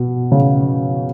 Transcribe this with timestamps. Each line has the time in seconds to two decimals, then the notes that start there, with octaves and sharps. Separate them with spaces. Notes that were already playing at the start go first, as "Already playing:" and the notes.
Already playing: B2
0.32 C#3